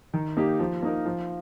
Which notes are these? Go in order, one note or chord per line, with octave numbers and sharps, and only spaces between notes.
D#3
A#3 D#4 G4
F3
A#3 D#4 A#4
F3